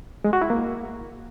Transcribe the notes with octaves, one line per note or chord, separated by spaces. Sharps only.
G#3
F#4
E4
A#3